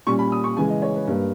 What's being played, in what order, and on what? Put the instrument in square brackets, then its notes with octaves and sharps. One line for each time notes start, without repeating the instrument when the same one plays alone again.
[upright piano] A#2 G3 C#4 C#6
B5
D#6
C#6
C#3 E3 G#3 G#5
D#5
C#5
B4
G2 G3 A#3